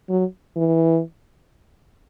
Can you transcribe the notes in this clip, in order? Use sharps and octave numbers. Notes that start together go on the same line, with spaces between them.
F#3
E3